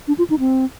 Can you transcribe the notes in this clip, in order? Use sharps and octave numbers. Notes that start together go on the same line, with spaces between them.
D4
F4
D#4
C4